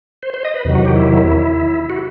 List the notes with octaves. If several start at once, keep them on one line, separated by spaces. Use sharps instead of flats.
C5
C5
D#5
B4
E2 C3 D#3 F#3
F#4
G4
E4
F#4